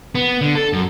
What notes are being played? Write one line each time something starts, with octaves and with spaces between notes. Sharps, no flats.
B3
D3
A4
F#2